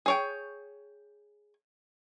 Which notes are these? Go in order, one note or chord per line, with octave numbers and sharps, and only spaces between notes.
G#4 C#5 G5